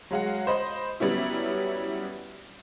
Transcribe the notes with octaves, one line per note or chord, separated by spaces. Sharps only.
F#3 G#3 F5 F#5
C5 D#5 B5
F#3 G3 B3 C#4 E4